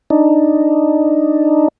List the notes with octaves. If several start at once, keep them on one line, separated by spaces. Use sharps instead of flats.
D4 D#4